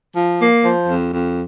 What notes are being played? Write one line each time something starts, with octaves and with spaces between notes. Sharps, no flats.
F3
A#3
F3
F2
F2